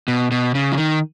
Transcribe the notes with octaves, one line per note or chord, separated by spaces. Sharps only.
B2
B2
C#3
F3
D#3